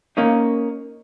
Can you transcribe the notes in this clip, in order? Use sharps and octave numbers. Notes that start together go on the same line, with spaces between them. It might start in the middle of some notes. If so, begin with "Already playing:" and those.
A#3 C#4 D#4